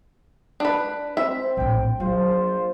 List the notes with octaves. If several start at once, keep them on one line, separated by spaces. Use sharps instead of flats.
D4 B4
C4 E5
A#1 A2 G5
A#1 F#3 F4 C5